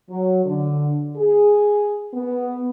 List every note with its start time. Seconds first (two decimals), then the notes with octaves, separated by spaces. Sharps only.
0.10 F#3
0.45 D3
1.17 G#4
2.14 B3